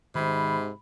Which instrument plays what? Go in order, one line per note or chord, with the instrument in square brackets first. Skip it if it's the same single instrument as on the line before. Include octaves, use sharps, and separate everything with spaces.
[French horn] G#2 [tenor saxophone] C3 [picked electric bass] D#3 [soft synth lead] B5